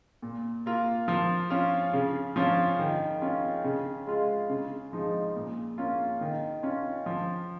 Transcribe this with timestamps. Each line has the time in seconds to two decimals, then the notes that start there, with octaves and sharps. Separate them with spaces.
0.22 A#2
0.66 A#3 F4
1.08 F3
1.50 C#4 F4
1.93 C#3
2.36 F3 C#4 F4
2.79 D#3
3.22 C#4 F4
3.64 C#3
4.07 G#3 F4
4.50 C#3
4.92 F3 G#3 D#4
5.36 A#2
5.78 A#3 C#4 F4
6.21 D#3
6.63 C#4 F4
7.06 F3